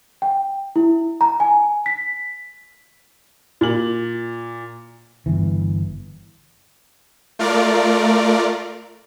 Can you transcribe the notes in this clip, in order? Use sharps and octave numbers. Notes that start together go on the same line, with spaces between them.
G5
E4
A#5
G#5
B6
A#2 F#7
G1 E3
A3 F4 A#4 D5